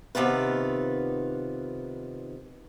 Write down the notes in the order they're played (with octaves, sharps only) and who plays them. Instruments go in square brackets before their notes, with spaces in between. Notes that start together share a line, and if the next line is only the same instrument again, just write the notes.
[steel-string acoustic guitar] C3 D#3 B3 F4 B4